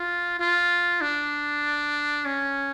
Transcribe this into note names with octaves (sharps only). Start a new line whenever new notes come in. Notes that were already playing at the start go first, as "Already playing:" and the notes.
Already playing: F4
F4
D4
C#4